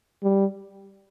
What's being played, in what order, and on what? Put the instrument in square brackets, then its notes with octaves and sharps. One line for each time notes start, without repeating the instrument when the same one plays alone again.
[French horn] G3